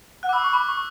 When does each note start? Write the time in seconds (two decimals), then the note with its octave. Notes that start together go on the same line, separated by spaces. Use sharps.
0.23 F#5 F#6
0.29 D6
0.33 B5 E6
0.43 C#6 F#6
0.52 B5 D6
0.68 C#6